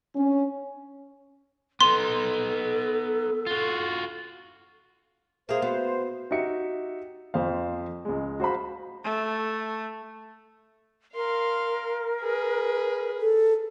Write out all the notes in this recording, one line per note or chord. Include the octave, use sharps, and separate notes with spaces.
C#4
B3 D#4 A4 C6
F4 F#4
A#3 G#4 C5 E5 F5
B3 F#4
D#4 F#4 G4 E5 C#7
F2 C5 F5
C#2 G#3
F#4 C5 F5 B5
A3
A#4 F5 C6
G#4 B4
A4